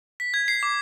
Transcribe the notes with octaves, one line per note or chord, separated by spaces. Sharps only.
B6
G#6
C7
D6